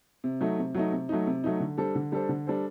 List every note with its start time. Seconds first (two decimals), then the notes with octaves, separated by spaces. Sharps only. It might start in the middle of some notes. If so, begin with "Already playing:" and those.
0.24 C3
0.41 F#3 A3 D#4
0.59 C3
0.75 F#3 A3 D#4
0.92 C3
1.09 F#3 A3 D#4
1.27 C3
1.44 F#3 A3 D#4
1.60 D3
1.78 G3 D4 A4 C5
1.95 D3
2.12 G3 D4 A4 C5
2.29 D3
2.47 G3 D4 A4 C5